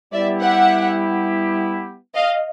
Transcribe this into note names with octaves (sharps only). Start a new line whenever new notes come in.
G3 B3 E4 G4 D5 E5
E5 F#5
D#5 F5